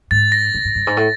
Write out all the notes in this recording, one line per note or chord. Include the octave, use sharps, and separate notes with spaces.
G#2 A6
A#6
G#2
G#2
G2
G#2
A2